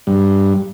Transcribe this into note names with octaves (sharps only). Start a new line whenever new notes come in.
G2